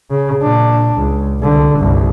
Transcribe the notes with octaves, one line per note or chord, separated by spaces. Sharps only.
C#3
A#2 D4
C#2
C2 D3
G1 C2